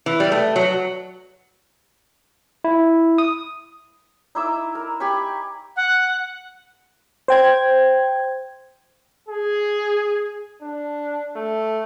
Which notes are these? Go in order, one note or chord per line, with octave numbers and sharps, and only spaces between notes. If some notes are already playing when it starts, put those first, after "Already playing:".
E3
G3
A3
F#3
E4
D#6
D#4 E4 D6 E6
A#4
G4 G#5 B5 C#6
F#5
C5 G5 G#6
G#4
D4
A3